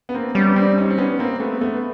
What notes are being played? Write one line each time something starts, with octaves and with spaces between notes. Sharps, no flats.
B3
A#3 C4
G3 B3 C#4
C4 D4
C#4 D#4
C4
B3 C#4
A#3 C4
A3 B3
A3 B3